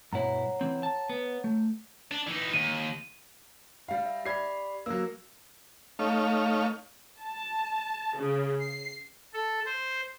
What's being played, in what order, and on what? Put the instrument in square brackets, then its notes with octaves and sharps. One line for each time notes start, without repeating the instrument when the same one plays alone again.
[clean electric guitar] G2 B2 E4 [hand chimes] C#5 F#5 A#5
[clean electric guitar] E3 C4
A5
B3
A3
[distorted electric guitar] D4
E3 D#4
[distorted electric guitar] D#2 [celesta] D#7
[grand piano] G3 F5
[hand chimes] E5
[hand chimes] G4 D5 B5 [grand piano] G#6 C7
[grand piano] F#3 A#3 [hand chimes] E6
[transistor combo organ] A3 D#4 C#5 F5
[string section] A5
C#3
C7
[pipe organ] A4
C5